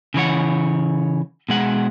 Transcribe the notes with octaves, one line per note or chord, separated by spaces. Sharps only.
C#3 E3 C#5 F#5
B2 G#3 F#5